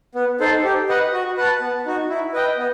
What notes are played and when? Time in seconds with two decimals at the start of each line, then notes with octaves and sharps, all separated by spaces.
0.15 B3
0.40 D#4 A4 C5
0.64 G4
0.89 B4 D#5 F#5
1.13 F#4
1.37 B4 F#5 A5
1.61 B3
1.86 D#4 F#4
2.09 E4
2.33 B4 D#5 G5
2.58 B3